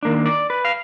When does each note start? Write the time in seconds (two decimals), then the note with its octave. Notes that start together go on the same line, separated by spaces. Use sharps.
0.03 D#3 A#3 D4
0.26 D5
0.50 B4
0.65 F5